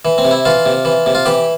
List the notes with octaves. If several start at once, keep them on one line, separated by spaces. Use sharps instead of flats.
E3
C4
C3
E4
E3 F4
C3
E3
C3
F4
E3 G4